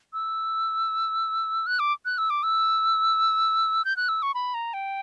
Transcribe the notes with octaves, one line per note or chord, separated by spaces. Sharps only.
E6
F#6
D6
F#6
E6
D6
E6
G6
F#6
E6
C#6
B5
A#5
G5